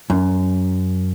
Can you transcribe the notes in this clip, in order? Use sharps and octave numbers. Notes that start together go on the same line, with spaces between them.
F#2